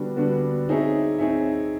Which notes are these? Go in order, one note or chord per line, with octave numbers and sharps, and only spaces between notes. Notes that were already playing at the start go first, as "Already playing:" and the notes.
Already playing: D3 G3 B3 D4 F#4
D3 G3 B3 D4 F#4
C4 D#4 G#4 C#5 E5
C4 D#4 G#4 C#5 E5